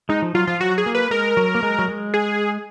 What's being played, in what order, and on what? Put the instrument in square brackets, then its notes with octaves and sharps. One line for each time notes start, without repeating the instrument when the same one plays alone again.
[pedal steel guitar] G#3 [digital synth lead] D#4
[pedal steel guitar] F3
[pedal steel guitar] F#3 [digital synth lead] F4
[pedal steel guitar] F3 [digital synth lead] F4
[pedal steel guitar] F#3 [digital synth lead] F#4
[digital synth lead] G#4
[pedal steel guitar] A#3
[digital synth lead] B4
[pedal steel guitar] G#3 [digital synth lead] A#4
[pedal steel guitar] F#3
A#3
G#3
F#3
G#3
[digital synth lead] G#4